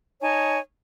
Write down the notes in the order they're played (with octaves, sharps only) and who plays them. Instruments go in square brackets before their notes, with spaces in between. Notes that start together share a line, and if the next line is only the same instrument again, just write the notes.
[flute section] D#4 C#5 G#5 A5